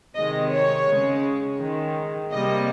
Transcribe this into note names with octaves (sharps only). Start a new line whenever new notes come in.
C3 D#3 G#3 D#5
C#5
C#3 G#3
D#3 G#3
C3 G3 A#3 D#5